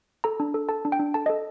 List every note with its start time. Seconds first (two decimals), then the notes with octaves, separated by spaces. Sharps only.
0.24 A4 A#5
0.40 D4
0.54 A4
0.69 A4 A5
0.85 D4
0.92 G5
0.99 D4
1.14 A4 A5
1.26 D#5
1.30 A4